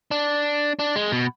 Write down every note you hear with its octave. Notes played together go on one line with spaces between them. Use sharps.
D4
D4
G#3
B2